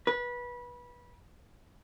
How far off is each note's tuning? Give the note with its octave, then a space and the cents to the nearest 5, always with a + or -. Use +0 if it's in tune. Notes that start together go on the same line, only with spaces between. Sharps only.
B4 -20